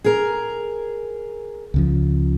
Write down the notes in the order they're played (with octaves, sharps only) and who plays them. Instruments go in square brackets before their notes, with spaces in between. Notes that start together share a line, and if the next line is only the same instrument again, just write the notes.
[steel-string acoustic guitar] G#4 A#4
[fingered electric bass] C#2 C#3 F3